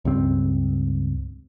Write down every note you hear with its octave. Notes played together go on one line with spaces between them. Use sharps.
C#2 G2 C4